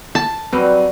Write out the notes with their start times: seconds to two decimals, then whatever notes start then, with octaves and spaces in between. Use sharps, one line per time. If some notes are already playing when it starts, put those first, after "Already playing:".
0.15 A5
0.52 F#3 G3 C4 B4